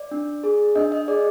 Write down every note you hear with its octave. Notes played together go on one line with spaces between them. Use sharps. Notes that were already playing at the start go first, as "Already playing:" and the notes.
Already playing: D5
D4
G#4
D4 D#5
D#5
G#4 D5